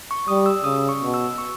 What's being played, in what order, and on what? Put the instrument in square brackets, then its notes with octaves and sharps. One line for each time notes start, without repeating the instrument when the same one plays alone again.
[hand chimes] C#6
[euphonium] G3 [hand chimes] D#6
[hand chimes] E6
[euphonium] C#3 [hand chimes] D#6
[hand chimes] C#6
[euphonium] B2
[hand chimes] E6
C#6